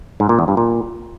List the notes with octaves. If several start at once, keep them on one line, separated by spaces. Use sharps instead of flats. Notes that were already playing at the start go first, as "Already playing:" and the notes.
G#2
A#2
E2
G2
A#2